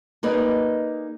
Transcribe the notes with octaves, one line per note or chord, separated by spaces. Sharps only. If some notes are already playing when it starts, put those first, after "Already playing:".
A#3 D#4 G#4 B4 D5 D#5